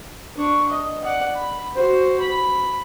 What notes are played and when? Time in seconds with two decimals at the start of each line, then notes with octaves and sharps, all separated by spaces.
0.36 D4 C#6
0.69 D#5
1.04 D5 F#5
1.35 B5
1.75 F#4 C5
2.20 B5